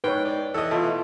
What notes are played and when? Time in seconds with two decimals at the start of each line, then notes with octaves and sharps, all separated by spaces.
0.04 G#2 B4 C#5 G5
0.25 D5
0.54 E3 A4 D#5
0.71 B2 A3 F4